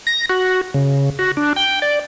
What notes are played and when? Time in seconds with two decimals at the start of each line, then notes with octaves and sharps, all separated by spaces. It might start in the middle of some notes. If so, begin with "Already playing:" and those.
0.07 A#6
0.29 F#4
0.74 C#3
1.19 F#4
1.37 D4
1.56 G5
1.82 D5